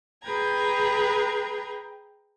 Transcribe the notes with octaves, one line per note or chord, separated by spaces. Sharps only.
G#4 B4 G5 A#5 G#6